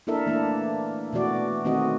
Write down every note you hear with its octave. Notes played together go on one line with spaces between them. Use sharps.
A#3 D4 E4 A4 A#4 E5
E3 A3 A#3 D4 E4
B2 E3 A3 F#4 D5
D#3 A3 C4 F#4 D#5